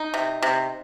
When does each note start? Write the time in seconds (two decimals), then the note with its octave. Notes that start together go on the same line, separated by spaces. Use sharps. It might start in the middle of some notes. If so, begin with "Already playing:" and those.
Already playing: D#4
0.14 C3
0.42 C3